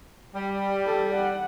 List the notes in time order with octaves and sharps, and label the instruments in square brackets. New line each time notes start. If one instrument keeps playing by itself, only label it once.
[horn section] G3
[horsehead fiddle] A4
F#5